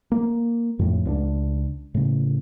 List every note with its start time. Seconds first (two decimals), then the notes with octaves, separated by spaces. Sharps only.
0.12 A#3
0.79 F2 A2
1.05 C#2 C4 D4
1.94 A2 C#3